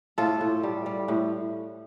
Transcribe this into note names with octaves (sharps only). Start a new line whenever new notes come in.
A2 F4 A4
A2
G3
G3
A2